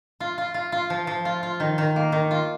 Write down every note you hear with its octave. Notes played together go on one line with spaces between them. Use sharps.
F4
F4
F4
F4
F3
F3
F4
F4
D#3
D#3
A#3
D#3
F4